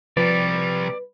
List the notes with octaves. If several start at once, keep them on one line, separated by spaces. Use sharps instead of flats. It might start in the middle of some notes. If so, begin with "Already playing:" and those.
C3 F3 G3 B4 D5